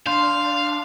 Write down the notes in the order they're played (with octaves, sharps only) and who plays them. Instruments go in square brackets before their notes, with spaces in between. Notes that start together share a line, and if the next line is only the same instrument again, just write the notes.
[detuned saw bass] D4 [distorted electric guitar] F5 [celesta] C6 G6